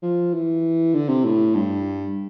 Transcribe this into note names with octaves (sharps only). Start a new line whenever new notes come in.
F3
E3
D3
C3
A2
G2